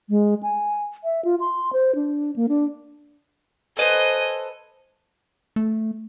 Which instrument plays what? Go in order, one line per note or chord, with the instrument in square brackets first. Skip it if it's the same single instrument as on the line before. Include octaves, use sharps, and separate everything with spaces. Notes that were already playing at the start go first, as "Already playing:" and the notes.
[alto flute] G#3
G#5
E5
F4
C6
C5
D4
A#3
D4
[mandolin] A4 B4 C5 [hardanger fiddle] D#5 G#5
[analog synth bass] A3